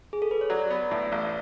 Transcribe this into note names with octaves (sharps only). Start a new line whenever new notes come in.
G#4
A4
B4
C#5
F#3 D5
B3
A2
A1